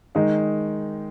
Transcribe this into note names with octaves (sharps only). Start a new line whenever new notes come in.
D#3 G#3 D#4